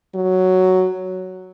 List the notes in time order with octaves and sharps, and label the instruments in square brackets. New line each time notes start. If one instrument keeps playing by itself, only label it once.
[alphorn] F#3